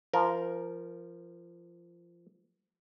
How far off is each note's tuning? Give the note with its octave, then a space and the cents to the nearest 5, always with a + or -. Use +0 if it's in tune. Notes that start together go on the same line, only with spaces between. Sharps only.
F3 -20 A#4 +0